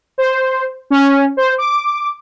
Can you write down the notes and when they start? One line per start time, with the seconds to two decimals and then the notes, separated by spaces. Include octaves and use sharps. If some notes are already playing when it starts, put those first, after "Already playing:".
0.18 C5
0.90 C#4
1.37 C5
1.58 D6